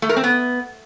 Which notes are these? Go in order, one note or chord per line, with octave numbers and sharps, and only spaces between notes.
A3
A#4
C4
B3